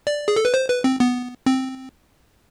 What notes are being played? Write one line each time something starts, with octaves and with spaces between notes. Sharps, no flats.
D5
G#4
A4
B4
C5
B4
C4
B3
C4